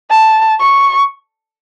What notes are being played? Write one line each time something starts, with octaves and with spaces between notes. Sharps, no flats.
A5
C#6